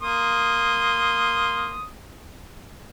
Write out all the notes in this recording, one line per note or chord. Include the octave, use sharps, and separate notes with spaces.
A#3 C6 D#6